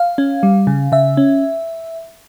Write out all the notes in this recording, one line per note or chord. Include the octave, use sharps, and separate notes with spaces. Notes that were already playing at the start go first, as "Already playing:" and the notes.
Already playing: F5
C#4
G3
C#3
C#3 E5
C#4